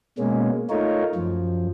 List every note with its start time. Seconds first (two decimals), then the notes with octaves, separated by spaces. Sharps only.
0.18 B2 G#3 A#3 C#4
0.70 A3 D#4 F4 A#4 C#5
1.15 F#2 F3